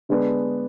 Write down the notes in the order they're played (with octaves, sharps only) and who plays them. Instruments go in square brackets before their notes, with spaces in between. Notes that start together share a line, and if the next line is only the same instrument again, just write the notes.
[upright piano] D3 G#3 B3 D4